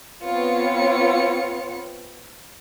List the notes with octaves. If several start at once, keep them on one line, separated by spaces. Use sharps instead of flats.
B3 C4 F4 C#5 C#7